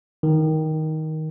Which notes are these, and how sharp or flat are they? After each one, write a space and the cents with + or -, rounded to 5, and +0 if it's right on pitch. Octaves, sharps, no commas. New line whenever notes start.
D#3 +10